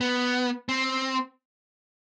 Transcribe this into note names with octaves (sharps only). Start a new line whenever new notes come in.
B3
C4